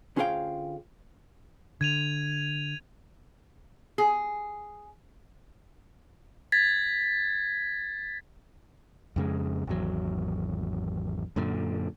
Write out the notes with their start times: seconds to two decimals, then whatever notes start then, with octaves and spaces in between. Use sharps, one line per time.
0.16 D2 C#4 F4 G#4 F5 G5
1.81 D3 G#6 D#7 F7
3.98 G#4
6.52 G#6 A6 B6
9.16 F2 C#3 G#3
9.67 G#1 E2 F#3
11.36 F#2 A#2 D3